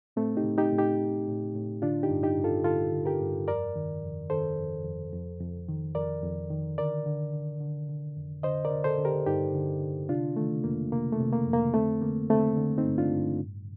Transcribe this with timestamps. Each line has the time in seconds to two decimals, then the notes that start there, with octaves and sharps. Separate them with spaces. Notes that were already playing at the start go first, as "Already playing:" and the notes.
0.16 A2 A3 C4
0.37 D#4 G4
0.45 A2
0.58 D#4 G4
0.72 A2
0.78 D#4 G4
0.99 A2
1.28 A2
1.55 A2
1.82 D3 D4 F4
2.03 D#4 G4
2.09 G2
2.23 D#4 G4
2.37 G2
2.44 F4 A4
2.64 D3 F4 A4
2.92 D3
3.06 G4 A#4
3.21 G2
3.48 F2 A#4 D5
3.76 D#3
4.03 F2
4.30 D#3 A4 C5
4.58 F2
4.85 F2
5.13 F2
5.41 F2
5.68 D#3
5.95 F2 A#4 D5
6.23 F2
6.50 D#3
6.78 D3 A#4 D5
7.06 D3
7.33 D3
7.60 D3
7.89 D3
8.16 F2
8.43 D3 C5 D#5
8.65 A#4 D5
8.70 D3
8.84 A4 C5
8.98 D3
9.05 G4 A#4
9.27 G2 D#4 G4
9.54 D3
9.81 D3
10.09 C3 D4 F4
10.36 D#3 A3
10.64 F2 A#3
10.92 C3 A#3
11.12 A3
11.20 C3
11.33 A#3
11.47 F2
11.53 A#3
11.74 D3 A3 C4
12.02 D3 A#3
12.30 D3 A3 C4
12.57 D3
12.78 C4 D#4
12.84 G2
12.98 D4 F4
13.12 G2
13.40 A2